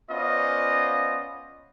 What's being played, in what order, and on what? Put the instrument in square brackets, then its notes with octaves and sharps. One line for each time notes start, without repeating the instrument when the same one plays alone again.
[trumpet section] B3 C#4 F4 C5 D5 D#5